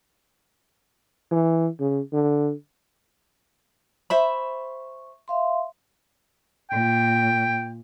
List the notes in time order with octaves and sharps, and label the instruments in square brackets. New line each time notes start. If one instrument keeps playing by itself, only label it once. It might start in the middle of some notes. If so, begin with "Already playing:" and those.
[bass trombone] E3
C#3
D3
[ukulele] C5 E5 B5 [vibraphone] C#6
[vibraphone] E5 F5 C6
[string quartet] A#2 [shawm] G5